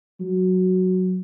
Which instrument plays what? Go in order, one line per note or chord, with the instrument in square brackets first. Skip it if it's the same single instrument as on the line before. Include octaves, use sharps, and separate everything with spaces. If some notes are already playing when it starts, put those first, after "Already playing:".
[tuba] F#3